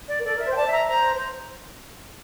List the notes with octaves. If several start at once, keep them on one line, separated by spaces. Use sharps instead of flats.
D5
A#4
A4 D5
A#4 E5
C5
G5
D5 A5
E5
A#5
C5 A#5
C5